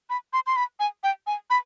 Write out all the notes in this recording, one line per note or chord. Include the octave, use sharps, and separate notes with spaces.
B5
C6
C6
B5
G#5
G5
G#5
B5